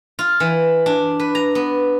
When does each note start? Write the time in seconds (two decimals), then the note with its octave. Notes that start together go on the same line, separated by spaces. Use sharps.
0.19 F4
0.40 E3
0.86 D4
1.20 B4
1.35 A#5
1.55 B3